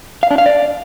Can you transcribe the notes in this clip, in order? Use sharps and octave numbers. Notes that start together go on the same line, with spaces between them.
F5
D4
F5
D5